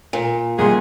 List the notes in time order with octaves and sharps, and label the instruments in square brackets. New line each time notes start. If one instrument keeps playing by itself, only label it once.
[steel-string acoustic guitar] A#2
[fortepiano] D#2 F#5 C6 [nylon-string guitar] C#3 G3 G#3 [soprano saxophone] G#4